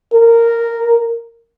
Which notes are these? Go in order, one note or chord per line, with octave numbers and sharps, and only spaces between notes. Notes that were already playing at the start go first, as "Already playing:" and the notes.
A#4